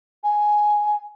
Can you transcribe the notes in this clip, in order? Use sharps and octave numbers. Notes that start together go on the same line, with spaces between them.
G#5